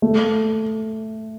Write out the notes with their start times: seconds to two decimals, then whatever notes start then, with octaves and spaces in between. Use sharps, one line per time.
0.02 A3